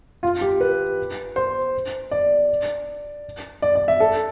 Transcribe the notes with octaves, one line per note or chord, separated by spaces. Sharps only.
F4
G4
B4
C5
D5
D5
D5
E5
A4